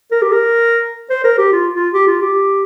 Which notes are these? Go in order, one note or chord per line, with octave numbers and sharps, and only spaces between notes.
A#4
G4
A#4
C5
A#4
G4
F4
F4
G4
F4
G4